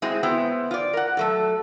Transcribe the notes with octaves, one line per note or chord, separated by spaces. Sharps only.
G#3 C4 E4 F#4 G#4
B3 E4 C5 G5
F4 D5
A#4 F#5
F#3 A3 A4